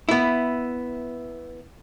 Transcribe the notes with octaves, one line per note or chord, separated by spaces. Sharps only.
B3 E4